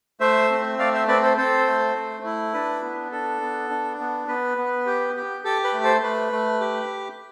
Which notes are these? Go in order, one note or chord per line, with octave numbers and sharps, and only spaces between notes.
A3 C5 E5
C4
A3 D5 F5
C5 E5
C4 B4 D5
A4 C5
C4 A4 C5
A3
A3
E4
D4 B4
B3
D4 A4
B3
D4
B3
B3 B4
B3
G4
G4
G4 A4
B4
A3
A4 C5
A3 B4
A3
G4